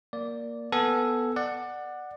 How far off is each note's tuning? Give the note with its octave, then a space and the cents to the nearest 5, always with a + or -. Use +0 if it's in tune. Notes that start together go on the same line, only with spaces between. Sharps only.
A#3 +0 D5 -10
B3 +0 A4 +0 G#5 +0
D5 +20 F#5 +0